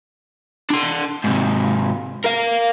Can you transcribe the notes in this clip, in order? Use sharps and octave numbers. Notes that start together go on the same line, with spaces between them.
D4 C6
G#2 C3
A#4 F5